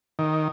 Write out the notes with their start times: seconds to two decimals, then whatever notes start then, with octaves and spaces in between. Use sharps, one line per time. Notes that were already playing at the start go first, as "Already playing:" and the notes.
0.19 D#3